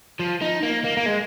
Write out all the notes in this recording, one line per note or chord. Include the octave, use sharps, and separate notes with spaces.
F3
D#4
A#3
A#3
A#3
G#3